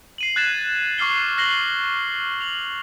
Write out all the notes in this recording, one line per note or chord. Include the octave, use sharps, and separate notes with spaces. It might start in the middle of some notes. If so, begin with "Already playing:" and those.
C7 D#7 F#7
F#6 G#6 A6 B6 E7
C#6 D6 F6 C7 G7
F6 F#6 A#6 C7 F#7 G7
F7 F#7